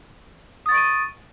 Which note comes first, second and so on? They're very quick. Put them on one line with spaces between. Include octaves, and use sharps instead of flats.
D#6 A6 C#6 D7 D#7